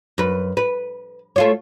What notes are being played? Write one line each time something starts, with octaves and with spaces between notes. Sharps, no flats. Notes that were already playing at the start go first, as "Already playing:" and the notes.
F#2 B4
B4
A3 F4 C#5